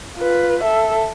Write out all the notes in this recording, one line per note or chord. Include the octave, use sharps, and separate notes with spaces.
F4 B4
A4 E5